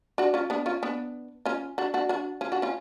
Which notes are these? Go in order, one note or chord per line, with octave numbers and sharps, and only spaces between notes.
D4 F#4
C#4 F4
B3 D4
C#4 F4
B3 D4
C#4 F4
D4 F#4
D4 F#4
D4 F#4
C#4 F4
D4 F#4
C#4 F4